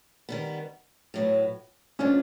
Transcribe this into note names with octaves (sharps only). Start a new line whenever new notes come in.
D#3 G3 B3
A2 F#3 B3
F3 G#3 B3 C#4 D4 F4